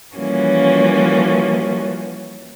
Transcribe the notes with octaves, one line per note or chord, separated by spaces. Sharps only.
E3 F3 G3 A#3 C#4 F#4